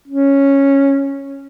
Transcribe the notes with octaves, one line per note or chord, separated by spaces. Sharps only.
C#4